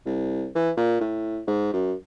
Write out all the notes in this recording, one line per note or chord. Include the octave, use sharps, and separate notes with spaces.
C2
E3
A#2
A2
G#2
F#2